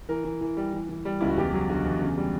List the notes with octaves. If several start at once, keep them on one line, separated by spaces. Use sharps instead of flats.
E3 A#4
E3
E3
G3
E3
E3
G3
C#2 E4
F#4
E2 G4
F#3
D3 F#4
E2
C#3
G3